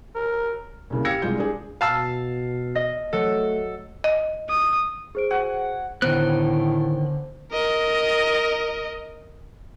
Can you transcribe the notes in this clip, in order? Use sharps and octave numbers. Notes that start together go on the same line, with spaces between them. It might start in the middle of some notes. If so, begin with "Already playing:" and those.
A#4
C2 C#3 A#3
G4 F5 E6 G#6 A#6 C#7
C2 G3 G#3 F4 G6
D4 G#4
B2 F5 A5 E6
D#5
F#3 A3 A4
D#5
D#6
G#4 C5 D7
F#4 F#5 G#5
A2 D3 D#3 B3 C5 F#6
A#4 D#5